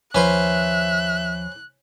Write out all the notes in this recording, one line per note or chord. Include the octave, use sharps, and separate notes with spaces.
D#2 F3 C#4 B4 C5 E5 F#6